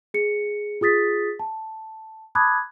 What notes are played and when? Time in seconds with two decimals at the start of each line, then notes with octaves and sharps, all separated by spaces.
0.14 G#4 C#7
0.81 F4 G#4 D#6 A6 B6
1.39 A5
2.35 A5 B5 D6 D#6 F#6 G#6